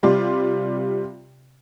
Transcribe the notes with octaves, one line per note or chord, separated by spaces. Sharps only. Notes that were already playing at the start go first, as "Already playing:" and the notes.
C3 G3 F4 D5 C6